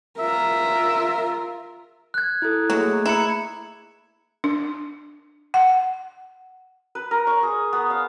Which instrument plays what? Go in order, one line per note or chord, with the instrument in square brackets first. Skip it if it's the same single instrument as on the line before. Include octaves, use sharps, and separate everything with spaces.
[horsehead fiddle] F4 A#4 [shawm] E5
[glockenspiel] F#6 G#6
[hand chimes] E4 A4
[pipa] F#3 [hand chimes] A3 A#3 G#4
[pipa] E4 [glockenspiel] A#5 C#7
[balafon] D4
F#5
[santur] B4
A#4
C#6
G#4
B3
F5